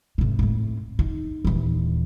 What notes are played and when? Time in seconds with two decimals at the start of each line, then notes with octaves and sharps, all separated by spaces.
0.18 G#1 C3
0.39 A2 C4
0.99 D#4
1.44 D#1 E3